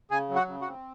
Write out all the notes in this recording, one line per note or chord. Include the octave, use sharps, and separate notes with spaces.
C#3 G#4 G#5
F#3
F#4 F#5
C#3
F#4 F#5
C4